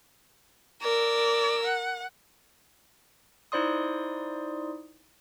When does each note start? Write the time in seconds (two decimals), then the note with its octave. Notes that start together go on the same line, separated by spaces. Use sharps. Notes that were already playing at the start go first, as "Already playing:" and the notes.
0.82 A#4 D5 E6
1.64 F#5
3.52 D#4 E4 C5 D5 C6 D#6